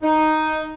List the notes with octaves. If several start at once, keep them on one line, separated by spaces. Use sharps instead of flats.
D#4